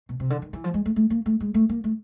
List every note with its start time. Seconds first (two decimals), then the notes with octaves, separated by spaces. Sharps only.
0.09 B2
0.20 C3
0.30 D3
0.42 D#3
0.53 E3
0.64 F3
0.74 G#3
0.86 A3
0.96 A3
1.10 A#3
1.26 A3
1.40 G#3
1.54 A3
1.69 A#3
1.84 A3